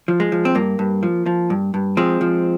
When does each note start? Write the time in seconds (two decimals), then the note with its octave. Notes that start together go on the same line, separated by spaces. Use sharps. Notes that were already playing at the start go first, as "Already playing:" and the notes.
0.08 F3
0.20 G#3
0.32 F3
0.45 C4
0.55 G2 A#3
0.79 G2
1.03 F3
1.26 F3
1.50 G2
1.74 G2
1.97 F3 G#3 C4
2.21 F3